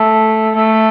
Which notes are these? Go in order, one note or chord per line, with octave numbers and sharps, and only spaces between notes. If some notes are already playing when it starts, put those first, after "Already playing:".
Already playing: A3
A3